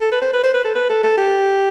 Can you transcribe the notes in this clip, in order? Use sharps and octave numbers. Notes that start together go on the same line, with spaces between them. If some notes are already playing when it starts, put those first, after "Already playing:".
A4
B4
C5
B4
C5
B4
A4
B4
A4
A4
G4